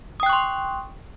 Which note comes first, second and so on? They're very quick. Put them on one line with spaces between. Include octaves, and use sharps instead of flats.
D#6 G5 F#6 C#6 C6